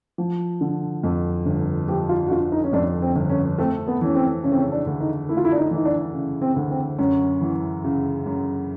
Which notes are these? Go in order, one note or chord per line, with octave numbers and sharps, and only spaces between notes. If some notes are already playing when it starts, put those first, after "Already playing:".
F3
D3
F2
G1
F3 G4
F4
F#4
D3 F4
D#4
C#4
F2 D4
C4
G1
C#4
A3 C4
B3
E3 C#4
C4
C#3 C#4
C4
C#4
D4
D2
D#4
A3 E4
F4
E4
D4
D#4
E3 D#4
D4
C#3
C4
D2
C4
F#2 C#4
E3
C#3
F#2